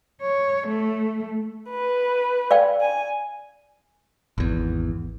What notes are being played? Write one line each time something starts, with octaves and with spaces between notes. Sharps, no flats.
C#5
A3
B4
D5 F5 G5
G#5
G#1 E2